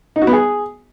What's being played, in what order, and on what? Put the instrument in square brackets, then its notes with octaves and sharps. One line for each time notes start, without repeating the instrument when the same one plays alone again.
[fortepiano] D#4
F#4
B3
G#4